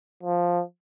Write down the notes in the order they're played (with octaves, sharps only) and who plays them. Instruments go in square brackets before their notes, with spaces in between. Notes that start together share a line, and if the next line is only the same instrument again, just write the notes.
[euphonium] F3